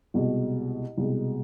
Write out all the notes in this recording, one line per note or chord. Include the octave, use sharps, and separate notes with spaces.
C2 B2 G#3
C2 B2 G#3